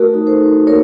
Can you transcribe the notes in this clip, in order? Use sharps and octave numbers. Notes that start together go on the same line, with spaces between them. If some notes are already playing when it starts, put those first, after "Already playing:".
Already playing: A3 F#4 A#4
D#4
A4 C5
D#4
A#3 A#4 C#5